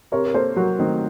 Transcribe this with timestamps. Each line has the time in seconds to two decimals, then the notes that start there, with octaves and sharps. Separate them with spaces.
0.12 C3 A#4 C#5
0.25 A#4
0.34 A#3 A4 C5
0.56 F#3 F#4 A#4
0.79 D#3 A3 C4